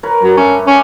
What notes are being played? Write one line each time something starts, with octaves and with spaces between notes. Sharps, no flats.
A#4 B4 C#5
F#3
G2 A3 C#4
C#4 G4 F#5